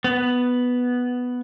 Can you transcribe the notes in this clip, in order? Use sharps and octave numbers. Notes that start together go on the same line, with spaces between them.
B3